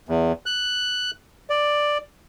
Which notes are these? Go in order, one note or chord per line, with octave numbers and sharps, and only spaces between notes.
E2
F#6
D5